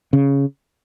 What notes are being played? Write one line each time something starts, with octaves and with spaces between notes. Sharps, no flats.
C#3